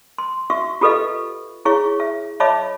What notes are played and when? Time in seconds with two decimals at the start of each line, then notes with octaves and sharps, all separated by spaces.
0.18 C6
0.50 F#4 E5 F5 C#6
0.81 F4 G4 A4 B4 D#5 F5
1.65 E4 G#4 C#5 F5 C#6
2.00 E5
2.40 C#5 D#5 E5 A5 B5 D6